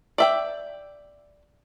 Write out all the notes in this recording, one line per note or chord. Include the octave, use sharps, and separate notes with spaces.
D5 E5 G5